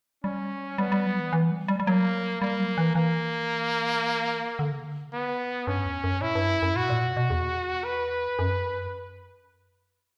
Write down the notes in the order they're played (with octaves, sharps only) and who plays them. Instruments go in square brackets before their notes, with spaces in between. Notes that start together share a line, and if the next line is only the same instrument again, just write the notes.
[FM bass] G3 [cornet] C#4
[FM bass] G3 [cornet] B3
[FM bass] G3
F#3
E3
E3
G3
G3
G3
[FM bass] F#3 [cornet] A#3
[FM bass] G3 [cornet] A#3
[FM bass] F#3
E3
[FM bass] E3 [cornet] A#3
[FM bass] D3
C#3
D3
[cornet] B3
[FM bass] G2 [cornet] C#4
[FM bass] E2
F#2
[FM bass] A#2 [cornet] E4
[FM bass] G2
F#2
F#2
[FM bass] A#2 [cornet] F#4
[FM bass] B2
A#2
B2
B2
E2
[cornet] B4
[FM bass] F#2